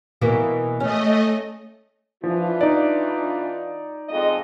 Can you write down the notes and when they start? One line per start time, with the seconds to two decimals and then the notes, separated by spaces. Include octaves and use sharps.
0.21 B2 E3 A#3
0.80 A3 C#4 D#5
2.24 E3 F3 D4 F4
2.61 D#4 D5
4.09 F2 G#3 D#5